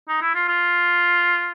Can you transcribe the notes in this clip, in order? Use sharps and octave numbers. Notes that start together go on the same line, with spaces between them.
D#4
E4
F4
F4